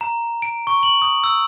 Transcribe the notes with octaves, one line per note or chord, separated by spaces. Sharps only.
A#5
D7
C#6
F#7
D#6
E6